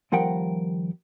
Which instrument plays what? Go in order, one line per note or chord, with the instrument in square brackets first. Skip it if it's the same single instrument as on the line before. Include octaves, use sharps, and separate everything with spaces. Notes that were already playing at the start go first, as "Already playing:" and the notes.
[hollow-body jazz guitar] D#2 F3 G3 A#4 F#5 G5